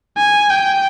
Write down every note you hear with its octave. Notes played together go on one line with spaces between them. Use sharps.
G#5
G5